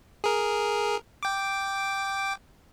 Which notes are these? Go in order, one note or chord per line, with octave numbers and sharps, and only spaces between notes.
G#4 A#4
G5 D6